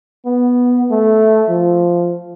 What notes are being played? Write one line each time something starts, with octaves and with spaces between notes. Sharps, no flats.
B3
A3
F3